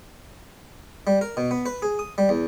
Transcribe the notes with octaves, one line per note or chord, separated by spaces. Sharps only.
G3
A#4
B2
B3
B4
G#4
D#6
G3
E2